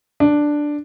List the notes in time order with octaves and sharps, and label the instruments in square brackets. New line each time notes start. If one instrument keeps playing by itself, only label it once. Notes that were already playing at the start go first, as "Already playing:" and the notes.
[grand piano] D4